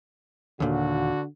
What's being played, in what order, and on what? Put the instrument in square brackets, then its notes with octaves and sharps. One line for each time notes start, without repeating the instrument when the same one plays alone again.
[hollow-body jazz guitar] D#2 A#2 [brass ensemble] D3 F#4